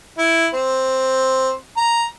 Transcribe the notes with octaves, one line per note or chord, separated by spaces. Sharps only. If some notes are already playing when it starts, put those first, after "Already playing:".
E4
C4
A#5